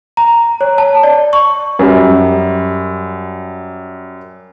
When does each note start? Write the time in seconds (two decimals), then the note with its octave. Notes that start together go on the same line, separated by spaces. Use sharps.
0.17 A#5
0.61 C#5
0.78 A5
1.03 D5
1.33 C#6
1.79 F#2 G3